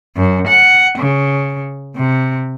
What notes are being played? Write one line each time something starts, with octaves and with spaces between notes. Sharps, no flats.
F#2
F#5
C#3
C3